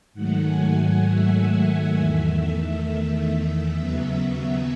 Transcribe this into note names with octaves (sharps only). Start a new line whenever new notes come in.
G#2 D#3 F#3 A3 F#5
G#5
E5
E2 D#3 A3
E5
D#2 C#3 F#3 B3